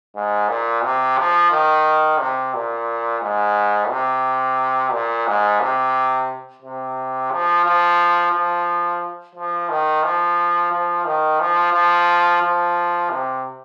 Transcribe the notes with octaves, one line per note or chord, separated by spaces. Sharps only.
G#2
A#2
C3
F3
D#3
C3
A#2
G#2
C3
A#2
G#2
C3
C3
F3
F3
F3
F3
D#3
F3
F3
D#3
F3
F3
F3
C3